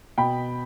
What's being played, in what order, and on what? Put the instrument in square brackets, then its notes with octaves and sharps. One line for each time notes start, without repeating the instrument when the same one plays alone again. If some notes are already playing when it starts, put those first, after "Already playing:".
[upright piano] B2 G5 B5